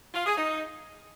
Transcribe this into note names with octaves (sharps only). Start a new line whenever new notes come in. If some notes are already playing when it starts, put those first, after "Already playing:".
F4
G#4
D#4